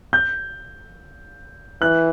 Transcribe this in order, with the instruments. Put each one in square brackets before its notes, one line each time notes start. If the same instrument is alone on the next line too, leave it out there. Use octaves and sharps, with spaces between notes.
[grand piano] G6
[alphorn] E3 [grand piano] F#6